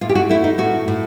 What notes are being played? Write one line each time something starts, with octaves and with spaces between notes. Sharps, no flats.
A2 F4
G4
F#4
A3 E4
D#4
A2 F#4
A2